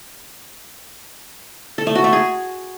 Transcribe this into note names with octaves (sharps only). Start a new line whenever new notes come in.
A4
A3
F#4
A3
G#4